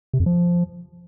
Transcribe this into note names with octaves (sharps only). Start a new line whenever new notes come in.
C3
F2
F3